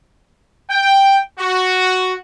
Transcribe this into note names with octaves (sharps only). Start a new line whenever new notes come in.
G5
F#4